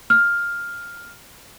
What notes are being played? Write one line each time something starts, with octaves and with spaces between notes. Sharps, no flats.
F6